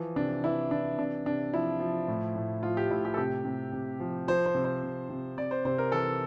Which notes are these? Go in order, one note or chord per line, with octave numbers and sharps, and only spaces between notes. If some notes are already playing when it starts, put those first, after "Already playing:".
Already playing: E3 F3
C3 D4
E3 E4
E3 D4
C3 D4
C3 D4
F3 E4
F3
A2
A2
F3 F4
G4
A2 E4
G4
A4
C3 G4
C3
C3
F3
F3 C5
C5
C3
C5
C3
C3
C3 D5
C5
C3 C5
A#4
E3 A4